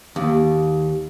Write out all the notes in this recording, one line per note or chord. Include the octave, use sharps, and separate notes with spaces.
D#2